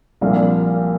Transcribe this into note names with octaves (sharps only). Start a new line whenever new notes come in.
C2 A#2 F3 A#3 D4 F5